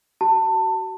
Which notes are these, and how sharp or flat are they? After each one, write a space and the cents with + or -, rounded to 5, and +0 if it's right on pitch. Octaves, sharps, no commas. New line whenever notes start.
F#4 +35 A5 +25